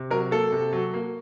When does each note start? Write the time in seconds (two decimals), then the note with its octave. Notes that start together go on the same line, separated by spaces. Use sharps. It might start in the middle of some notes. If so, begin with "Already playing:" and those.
Already playing: C3
0.10 F#3 A#4
0.31 A#3 A4
0.52 C3
0.73 F#3
0.94 A#3